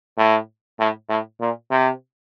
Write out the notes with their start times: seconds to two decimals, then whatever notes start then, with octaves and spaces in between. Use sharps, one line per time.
0.18 A2
0.80 A2
1.10 A2
1.41 A#2
1.71 C3